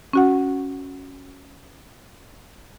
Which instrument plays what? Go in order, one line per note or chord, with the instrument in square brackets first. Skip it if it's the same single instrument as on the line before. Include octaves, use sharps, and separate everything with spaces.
[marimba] C#4 F#4 F#5